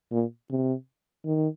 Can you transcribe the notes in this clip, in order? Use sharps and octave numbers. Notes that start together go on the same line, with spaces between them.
A#2
C3
D#3